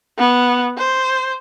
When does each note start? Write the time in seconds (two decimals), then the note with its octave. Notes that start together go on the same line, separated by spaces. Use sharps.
0.18 B3
0.78 C5